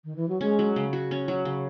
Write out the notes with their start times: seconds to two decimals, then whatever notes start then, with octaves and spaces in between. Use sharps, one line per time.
0.05 D#3
0.16 E3
0.29 F#3
0.41 G#3 C#4
0.59 F#3
0.76 C#3
0.93 F#4
1.11 C#4
1.28 F#3
1.45 C#3